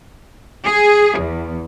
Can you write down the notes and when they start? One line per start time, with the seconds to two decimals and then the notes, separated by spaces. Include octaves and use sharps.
0.66 G#4
1.18 E2